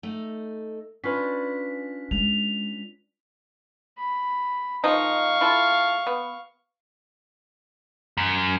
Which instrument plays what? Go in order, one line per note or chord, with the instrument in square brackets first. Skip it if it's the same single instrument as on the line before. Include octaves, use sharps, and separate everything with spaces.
[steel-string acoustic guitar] A3 D#4
[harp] C#4 F4 B4 [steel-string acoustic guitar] D4 [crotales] B6
[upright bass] G#3 [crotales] F7
[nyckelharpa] B5
[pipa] D#3 F3 D#4 [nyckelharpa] F5 C#6
[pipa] E4 F4 A4
B3
[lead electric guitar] F#2